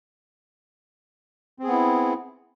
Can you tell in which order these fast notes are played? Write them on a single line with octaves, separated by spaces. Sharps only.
C4 G#4 B3 E4